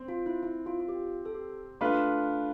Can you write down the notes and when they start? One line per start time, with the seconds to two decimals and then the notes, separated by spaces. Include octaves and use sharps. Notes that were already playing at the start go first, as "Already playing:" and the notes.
Already playing: C4
0.08 F4
0.26 E4
0.43 E4
0.66 F4
0.80 F4
0.89 G4
1.25 A4
1.35 G4
1.81 A3 D4 F4 B4